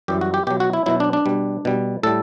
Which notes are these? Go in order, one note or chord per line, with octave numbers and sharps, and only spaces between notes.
F#2 E3 G3 G4
F#4
G4
B2 F#3 G4
F#4
E4
B2 F#3 E4
D4
D4
B2 G3
B2 G3
A2 G3 A4